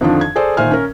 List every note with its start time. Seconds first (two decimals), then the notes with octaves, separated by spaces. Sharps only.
0.01 F2 D3 D#3 F3 D4
0.21 G#6
0.36 G#4 A4 C5 D5
0.57 A#2 D#3 C5 E5 G#5 F6
0.71 C#4 A#4